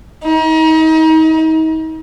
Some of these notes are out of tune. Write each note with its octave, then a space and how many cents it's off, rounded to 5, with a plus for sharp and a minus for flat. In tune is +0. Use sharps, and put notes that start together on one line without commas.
D#4 +35